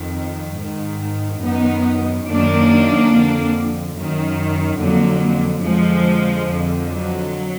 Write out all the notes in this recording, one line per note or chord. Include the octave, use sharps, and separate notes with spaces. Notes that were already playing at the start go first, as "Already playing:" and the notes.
Already playing: F2 D#3
G#2 D#3
F#2 D#3 B3 D#4
F#2 D#3 A#3 D4
F2 D3
F#2 D#3
F2 D3 F#3 A#3
F2 D3 F3 G#3
F2 D3
F#3